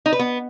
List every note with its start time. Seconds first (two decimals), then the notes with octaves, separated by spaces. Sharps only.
0.06 D#4
0.13 B4
0.19 B3